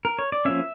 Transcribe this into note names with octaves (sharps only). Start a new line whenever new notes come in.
A#4
C#5
D5
F3 A#3 C#4 E5